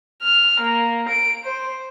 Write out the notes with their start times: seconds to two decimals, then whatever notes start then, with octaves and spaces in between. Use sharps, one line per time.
0.23 F6
0.60 A#3
1.09 D7
1.44 C5